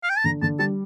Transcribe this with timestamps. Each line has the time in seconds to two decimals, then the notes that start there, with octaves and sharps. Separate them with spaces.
0.03 F5
0.10 G5
0.18 A5
0.24 D3 A#5
0.42 D3 A5
0.59 G3 A5